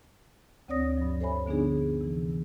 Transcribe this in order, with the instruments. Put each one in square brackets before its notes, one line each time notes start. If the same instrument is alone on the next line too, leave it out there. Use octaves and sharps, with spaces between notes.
[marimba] D2 C4 C#5 D5 D#6 A#6
G2 F3
A4 C5 C#5 E5 G#5 B5
D3 B3 D4 D#4 G#4
C3 E3